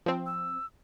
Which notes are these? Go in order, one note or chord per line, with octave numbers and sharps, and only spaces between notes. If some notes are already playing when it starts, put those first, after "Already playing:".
F3 C4
E6